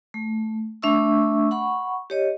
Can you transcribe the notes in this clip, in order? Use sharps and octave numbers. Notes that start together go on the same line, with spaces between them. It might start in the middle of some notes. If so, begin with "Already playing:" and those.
A3
A3 D4 E5 C#6 E6
F#5 B5 C#6
G4 C#5 D#5